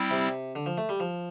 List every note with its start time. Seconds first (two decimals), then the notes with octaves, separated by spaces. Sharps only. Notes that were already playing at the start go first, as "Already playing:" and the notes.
Already playing: G3 C4 E4
0.11 C3
0.55 D3
0.66 F3
0.78 A3
0.89 G3
1.00 F3